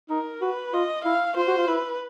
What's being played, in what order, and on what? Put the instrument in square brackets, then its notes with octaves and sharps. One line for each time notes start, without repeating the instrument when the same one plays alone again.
[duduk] D#4 [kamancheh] A#4
[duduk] F#4 [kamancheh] B4
[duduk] F4 [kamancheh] D#5
[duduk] E4 [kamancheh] F5
[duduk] F4 [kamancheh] C5
[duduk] F#4
F4
[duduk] E4 [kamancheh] B4